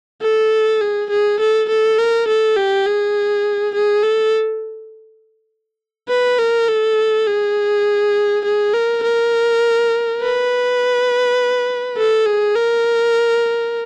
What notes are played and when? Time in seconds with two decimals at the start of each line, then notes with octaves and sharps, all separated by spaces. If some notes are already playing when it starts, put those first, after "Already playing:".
0.22 A4
0.81 G#4
1.10 G#4
1.40 A4
1.69 A4
1.98 A#4
2.28 A4
2.57 G4
2.86 G#4
3.75 G#4
4.03 A4
6.09 B4
6.39 A#4
6.68 A4
7.27 G#4
8.45 G#4
8.73 A#4
9.03 A#4
10.21 B4
11.98 A4
12.26 G#4
12.56 A#4